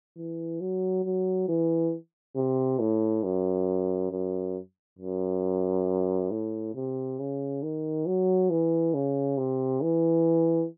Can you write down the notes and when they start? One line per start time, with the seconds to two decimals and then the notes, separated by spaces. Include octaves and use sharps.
0.17 E3
0.61 F#3
1.04 F#3
1.49 E3
2.36 C3
2.80 A2
3.24 F#2
4.11 F#2
4.99 F#2
6.31 A2
6.75 C3
7.19 C#3
7.63 D#3
8.07 F#3
8.50 E3
8.94 C#3
9.38 C3
9.83 E3